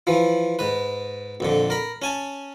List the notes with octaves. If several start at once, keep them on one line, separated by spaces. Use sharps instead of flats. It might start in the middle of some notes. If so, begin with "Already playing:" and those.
E3 F3
G#2 B4
A#1 F2 D3
A#4 B5
C#4 G#5 A5